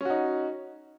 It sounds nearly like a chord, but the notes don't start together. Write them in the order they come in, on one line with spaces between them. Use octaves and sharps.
C#4 F#4 D#4